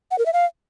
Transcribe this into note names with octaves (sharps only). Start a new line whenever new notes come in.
F#5
A#4
E5
F5